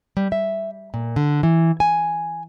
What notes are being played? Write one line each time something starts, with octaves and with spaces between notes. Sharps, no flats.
G3
E5
A#2
D3
E3
G#5